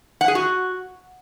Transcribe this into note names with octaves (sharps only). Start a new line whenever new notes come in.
F#5
G#4
F#4